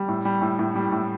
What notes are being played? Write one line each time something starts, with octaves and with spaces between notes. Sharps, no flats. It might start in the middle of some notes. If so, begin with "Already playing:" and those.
Already playing: G3
A2
G3
A2
A2
G3
A2